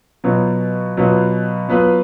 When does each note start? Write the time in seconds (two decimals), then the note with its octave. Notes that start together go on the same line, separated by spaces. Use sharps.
0.24 B2 F#3 B3 F4
0.97 B2 F#3 B3 F4
1.69 F#3 B3 F4 B4